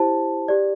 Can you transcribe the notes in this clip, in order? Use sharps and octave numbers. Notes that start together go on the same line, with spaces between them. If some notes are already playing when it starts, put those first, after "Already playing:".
Already playing: E4 G4 C5 A5
G4 D5